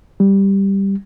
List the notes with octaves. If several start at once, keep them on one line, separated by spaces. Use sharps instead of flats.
G3